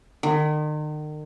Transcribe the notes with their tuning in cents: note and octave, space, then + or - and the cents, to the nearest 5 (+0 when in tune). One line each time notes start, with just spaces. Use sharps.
D#3 -40